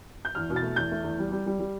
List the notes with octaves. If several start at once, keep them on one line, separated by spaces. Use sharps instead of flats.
G6
E2 F6
B2
A6
A3
E2 G6
A3
E2
G3
G3
G3
G3